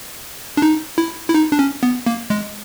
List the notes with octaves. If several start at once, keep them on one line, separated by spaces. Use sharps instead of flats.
D4
D#4
E4
E4
D#4
D4
C#4
B3
A#3
G#3